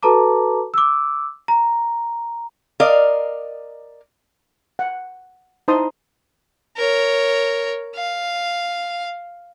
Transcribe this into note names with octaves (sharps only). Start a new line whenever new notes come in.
F#4 A4 B4 A5 A#5 D6
D6 E6
A#5
A#4 D5 D#5 F5
F#5
D#4 E4 C5 A5 C6 D#6
A#4 C#5
F5